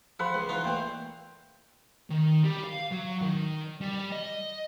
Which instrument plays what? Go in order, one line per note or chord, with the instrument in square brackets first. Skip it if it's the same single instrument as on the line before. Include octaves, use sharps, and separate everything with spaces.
[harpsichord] F3 [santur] F#5 B5 C6
[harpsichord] C#2
[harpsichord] E3 D#4 F4 [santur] C6
[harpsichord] A#2 A3 [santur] G5
[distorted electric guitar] D#3
G3
F5
F#3
D#3
G3
D#5